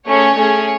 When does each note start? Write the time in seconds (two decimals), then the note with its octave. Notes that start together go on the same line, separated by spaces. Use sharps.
0.09 A3 C#4 G#4 C#5
0.38 A3 C#4 G#4